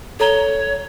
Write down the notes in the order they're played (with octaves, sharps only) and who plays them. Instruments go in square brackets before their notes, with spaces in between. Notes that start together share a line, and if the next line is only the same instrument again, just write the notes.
[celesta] A4 A#5 G7 [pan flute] C#5